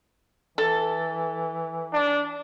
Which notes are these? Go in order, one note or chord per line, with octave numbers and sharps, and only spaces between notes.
E3 A4
D4